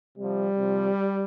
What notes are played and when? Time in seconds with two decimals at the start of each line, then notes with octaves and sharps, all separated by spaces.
0.18 C3 F3 G3
0.58 C3 F3